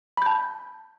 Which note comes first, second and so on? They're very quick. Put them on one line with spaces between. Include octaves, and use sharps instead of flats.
B5 G6 A5